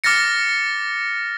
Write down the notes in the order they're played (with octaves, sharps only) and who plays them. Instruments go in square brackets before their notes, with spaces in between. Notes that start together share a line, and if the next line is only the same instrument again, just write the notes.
[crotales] D6 F6 A6 A#6 C#7